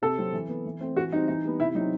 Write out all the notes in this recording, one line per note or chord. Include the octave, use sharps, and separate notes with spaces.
C3 A4
F#3 C4
E3
B3
E3
A3 C4
E3 F#4
G3 C4 D#4
E3 D#4
G3 B3
C3 E4
F#3 D#4
C4